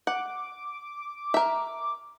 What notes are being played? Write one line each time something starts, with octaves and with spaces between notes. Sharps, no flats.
F#5 D6
A#4 E5